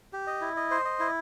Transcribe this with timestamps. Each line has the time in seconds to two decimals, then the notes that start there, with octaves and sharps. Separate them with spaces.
0.13 G4
0.27 D#5
0.41 E4
0.57 D#5
0.71 C5
0.85 D#5
1.00 E4